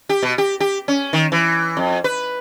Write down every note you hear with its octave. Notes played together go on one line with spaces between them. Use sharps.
G4
B2
G4
G4
C#4
D#3
E3
F2
B4